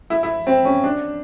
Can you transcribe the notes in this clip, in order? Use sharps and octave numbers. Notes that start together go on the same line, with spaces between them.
E4
E4
C4
C#4
D4